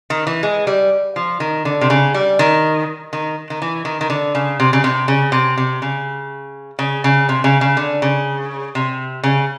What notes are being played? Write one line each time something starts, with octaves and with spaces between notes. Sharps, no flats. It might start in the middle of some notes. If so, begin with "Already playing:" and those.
D#3
E3
G#3
G3
F3
D#3
D3
C3
C#3
G3
D#3
D#3
D#3
E3
D#3
D#3
D3
C#3
C3
C#3
C3
C#3
C3
C3
C#3
C#3
C#3
C3
C#3
C#3
D3
C#3
C3
C#3